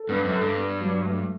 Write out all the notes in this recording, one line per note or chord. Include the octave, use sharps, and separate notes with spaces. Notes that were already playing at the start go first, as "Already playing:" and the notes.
Already playing: A4
G2 B3
F#2
A4
G2
B3
F#3
A3